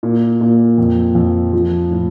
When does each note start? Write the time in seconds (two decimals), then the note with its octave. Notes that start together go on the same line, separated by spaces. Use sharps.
0.03 A#2
0.41 A#2
0.78 F2
1.15 F2
1.53 F3
1.91 A2